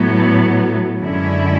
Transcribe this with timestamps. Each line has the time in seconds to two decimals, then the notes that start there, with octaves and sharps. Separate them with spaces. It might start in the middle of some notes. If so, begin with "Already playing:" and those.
Already playing: A2 F#3 B3
0.99 F#2 D3 G#3 C#4 E4